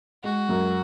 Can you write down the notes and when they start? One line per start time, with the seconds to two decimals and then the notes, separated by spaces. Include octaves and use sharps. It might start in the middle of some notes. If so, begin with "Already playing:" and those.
0.24 G#3 F#4
0.49 F#2